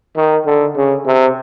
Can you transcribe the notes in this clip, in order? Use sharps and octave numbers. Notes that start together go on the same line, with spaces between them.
D#3
D3
C#3
C3